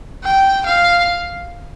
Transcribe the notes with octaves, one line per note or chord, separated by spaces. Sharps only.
G5
F5